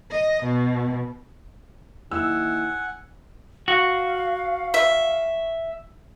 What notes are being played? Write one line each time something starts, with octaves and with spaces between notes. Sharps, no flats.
D#5
B2
D#2 E4 F#5 G#5 E6
F#4 F5
E5